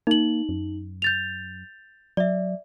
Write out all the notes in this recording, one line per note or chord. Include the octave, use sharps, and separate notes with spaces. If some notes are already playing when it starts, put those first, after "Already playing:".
A#3 D#4 F#7
F#2
G6 A6 F7
F#3 D5 E5